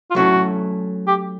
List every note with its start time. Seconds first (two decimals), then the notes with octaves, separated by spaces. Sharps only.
0.11 F4
0.15 F#3 A3 C#4 E4 F#4 A4
1.07 G4